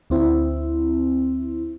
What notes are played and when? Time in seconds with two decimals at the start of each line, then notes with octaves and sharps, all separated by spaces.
0.10 D2 C4 E4